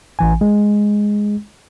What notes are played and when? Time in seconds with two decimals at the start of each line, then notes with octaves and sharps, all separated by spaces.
0.19 A1 E3 G#5
0.41 G#3